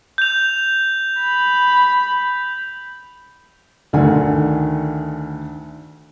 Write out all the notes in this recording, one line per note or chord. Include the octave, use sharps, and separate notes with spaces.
G6 F7
B5
D2 D3 D#3 F#5 G#5